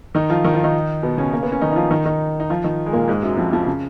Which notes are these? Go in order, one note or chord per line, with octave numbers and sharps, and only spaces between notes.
D#3 D#4
F3 F4
D#3 D#4
F3 F4
D#3 D#4
B2 B3
C#3 C#4
A#3
B3
C#4
D#3 D#4
D#4
F3 F4
D#3 D#4
D#3 D#4
D#4
F3 F4
D#3 D#4
G#3
A#2 A#3
G#2 G#3
F#2 F#3
F2 F3
F2 F3
C#3